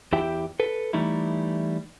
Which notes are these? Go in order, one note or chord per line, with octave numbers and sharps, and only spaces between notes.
E2 E4 G4 E5 G5
A4 B4
E3 G3 A3 D#4 E4